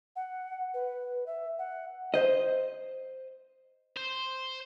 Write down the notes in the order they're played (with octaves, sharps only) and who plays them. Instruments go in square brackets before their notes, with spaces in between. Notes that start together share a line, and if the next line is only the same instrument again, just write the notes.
[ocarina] F#5
B4
E5
F#5
[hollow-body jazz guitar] C5 D#5
[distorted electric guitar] C5